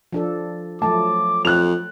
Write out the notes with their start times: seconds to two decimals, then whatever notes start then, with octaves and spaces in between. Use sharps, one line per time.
0.13 F3 D4 A4
0.82 F3 F#3 A3 A5 D6
1.45 F2 C5 F#6 F7